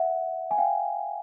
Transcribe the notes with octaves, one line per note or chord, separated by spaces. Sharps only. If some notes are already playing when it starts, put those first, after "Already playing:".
Already playing: E5 F#5
G#5
F5 G5